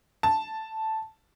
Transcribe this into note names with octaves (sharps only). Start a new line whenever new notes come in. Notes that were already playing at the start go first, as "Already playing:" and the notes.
A5